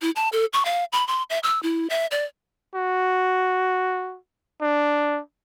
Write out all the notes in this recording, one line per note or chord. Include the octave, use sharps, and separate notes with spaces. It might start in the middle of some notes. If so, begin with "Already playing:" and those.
E4
A5
A4
C#6
F5
B5
C6
E5
E6
E4
E5
D5
F#4
D4